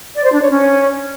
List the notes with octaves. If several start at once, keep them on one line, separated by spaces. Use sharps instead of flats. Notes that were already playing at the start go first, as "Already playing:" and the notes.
D5
C5
D4
C#5
C#4